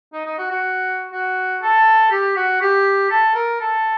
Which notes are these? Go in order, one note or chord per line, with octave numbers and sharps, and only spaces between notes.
D#4
D#4
F#4
F#4
F#4
A4
G4
F#4
G4
A4
A#4
A4